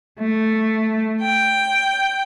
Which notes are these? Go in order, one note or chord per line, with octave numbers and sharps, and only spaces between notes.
A3
G5